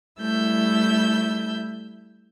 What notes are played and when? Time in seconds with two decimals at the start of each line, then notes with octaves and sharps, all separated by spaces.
0.20 G3 A3 E4 E6 G6